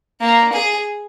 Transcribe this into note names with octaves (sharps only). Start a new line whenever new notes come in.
A#3
G#4